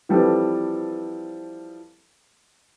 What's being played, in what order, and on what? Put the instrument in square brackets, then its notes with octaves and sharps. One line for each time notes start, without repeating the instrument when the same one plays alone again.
[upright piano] E3 F3 G3 C4 A4 B4